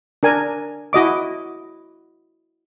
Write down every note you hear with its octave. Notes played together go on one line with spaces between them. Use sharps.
D4 A#4 G#5
E4 F#4 D#5 D6